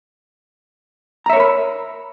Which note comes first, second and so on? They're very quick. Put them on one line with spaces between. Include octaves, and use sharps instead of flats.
A#5 E5 C#5 A#4 B5